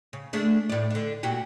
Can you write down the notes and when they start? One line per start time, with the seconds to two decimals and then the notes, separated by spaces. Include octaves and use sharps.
0.13 C#3
0.33 A3 D4 G#4
0.69 A2 D5
0.90 D3 D4
1.23 A#2 F#4 G4